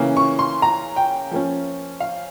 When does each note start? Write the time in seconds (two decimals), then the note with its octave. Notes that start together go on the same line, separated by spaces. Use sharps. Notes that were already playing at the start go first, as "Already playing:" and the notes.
Already playing: C#3 E3 A#3 C#4
0.17 C#6
0.39 C6
0.62 A#5
0.96 G5
1.31 F3 A#3 C#4
2.00 F5